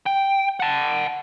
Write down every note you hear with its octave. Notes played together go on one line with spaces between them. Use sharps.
G5
F#5 A5